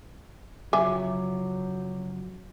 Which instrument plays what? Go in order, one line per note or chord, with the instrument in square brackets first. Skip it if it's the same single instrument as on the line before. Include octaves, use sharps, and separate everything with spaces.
[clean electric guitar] F#2 C#3 F3 [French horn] F#3 [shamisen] E5 G#5 [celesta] D6